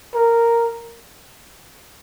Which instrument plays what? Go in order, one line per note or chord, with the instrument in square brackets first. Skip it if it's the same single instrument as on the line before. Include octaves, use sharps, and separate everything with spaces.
[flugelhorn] A#4